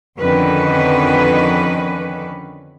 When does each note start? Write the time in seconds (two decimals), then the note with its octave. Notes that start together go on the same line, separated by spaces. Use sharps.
0.19 F2 D3 D#3 C#4 B4